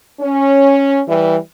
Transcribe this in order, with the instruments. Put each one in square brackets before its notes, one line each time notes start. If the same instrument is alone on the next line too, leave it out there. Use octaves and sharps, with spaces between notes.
[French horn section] C#4
E3 G3